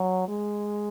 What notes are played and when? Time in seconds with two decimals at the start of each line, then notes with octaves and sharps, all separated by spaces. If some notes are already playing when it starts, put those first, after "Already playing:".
Already playing: F#3
0.28 G#3